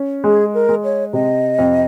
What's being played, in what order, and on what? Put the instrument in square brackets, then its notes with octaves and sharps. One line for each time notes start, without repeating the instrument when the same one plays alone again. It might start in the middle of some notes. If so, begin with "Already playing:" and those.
Already playing: [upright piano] C#4
[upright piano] G#3 [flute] G#4
[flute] A#4
[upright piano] G#3
[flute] C#5
[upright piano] C3 [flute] D#5
[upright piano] F2